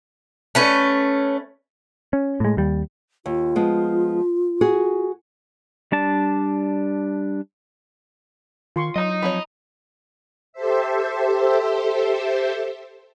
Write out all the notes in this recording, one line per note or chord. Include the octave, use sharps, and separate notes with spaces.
A3 C#4 B4
C#4
A2 G#3
D#2 G3
D#2 F4
F3 G#3 B3
F#4 G#4
G3 D4 A5
D#3 F4 C6 C#6
F#3 D#5 A#5
F3 C4 C#5 B5
G4 A4 C5 E5